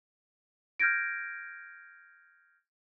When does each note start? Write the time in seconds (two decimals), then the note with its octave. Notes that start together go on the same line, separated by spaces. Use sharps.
0.80 F6 G6 G#6 A#6 D7